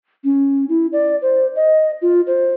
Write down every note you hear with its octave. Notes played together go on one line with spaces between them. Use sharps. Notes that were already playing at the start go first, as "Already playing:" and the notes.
C#4
E4
D5
C5
D#5
F4
C5